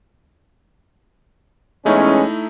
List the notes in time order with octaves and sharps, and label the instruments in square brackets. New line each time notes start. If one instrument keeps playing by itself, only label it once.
[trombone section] E2 G#3 C#4 [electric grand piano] A3 D#4 E4